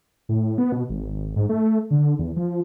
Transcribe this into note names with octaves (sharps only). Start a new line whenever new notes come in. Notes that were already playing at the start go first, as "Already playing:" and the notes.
A2
B3
B2
G#1
G#2
A3
D3
E2
F3